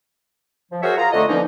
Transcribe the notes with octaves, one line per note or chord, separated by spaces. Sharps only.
F3
F#4 G#4 A#4 C5 C#5 E5
F4 G#4 A#5
F2 D3 A3 D#5
D3 E3 F3 A#3 C#4 D#4